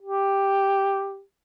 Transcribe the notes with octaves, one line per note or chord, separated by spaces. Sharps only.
G4